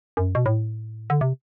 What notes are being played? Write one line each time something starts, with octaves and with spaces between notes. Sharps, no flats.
F#2
B2
A2
D3
C3